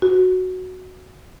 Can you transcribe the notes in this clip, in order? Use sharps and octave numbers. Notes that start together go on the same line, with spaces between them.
F#4